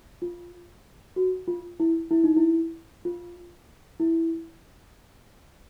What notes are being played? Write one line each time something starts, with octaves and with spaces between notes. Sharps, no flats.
F4
F#4
F4
E4
E4
D#4
E4
F4
E4